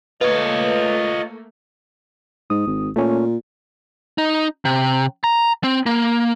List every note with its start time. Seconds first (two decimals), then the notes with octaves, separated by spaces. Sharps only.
0.21 A3 A#3 F4 B4 C#5 D#5
2.50 G#2 D#6
2.67 G#1
2.96 A#2 A3 C#4
4.18 D#4
4.65 C3
5.24 A#5
5.64 C4
5.86 A#3